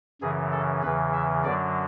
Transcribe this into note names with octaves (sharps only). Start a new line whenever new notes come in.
F#2 C#3 E3 G#4
A4
E2 C#3 E3 B4
E5
F#2 D3 F#3 D5